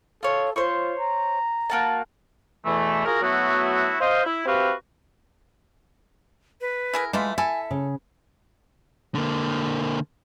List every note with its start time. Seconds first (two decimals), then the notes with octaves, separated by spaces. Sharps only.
0.23 F4 A4 C#5
0.56 F4 C5 C#5 C#6
0.99 A#5
1.70 A#3 F#4 A5
2.65 E2 B2 E3 A3
3.05 F4 F#4 G#4 A#4
3.22 F#3 A3 B3 E4 F#4
4.00 C5 D#5 F5
4.23 E4
4.45 C4 F#4 G4 B4 E5 F5
6.61 B4
6.93 E4 G#4 A#4
7.13 E3 G#3 A3 F4 E5
7.38 E4 A4 G#5
7.71 C#3
9.15 D3 A#3